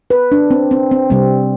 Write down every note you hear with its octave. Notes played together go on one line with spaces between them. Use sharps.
B4
D4
C4
C4
C4
C3 G3 C4